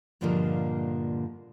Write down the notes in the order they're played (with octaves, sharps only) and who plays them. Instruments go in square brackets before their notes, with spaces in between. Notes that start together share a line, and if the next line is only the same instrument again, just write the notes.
[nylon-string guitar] G2 A#2 D3 F3 G#3 A#3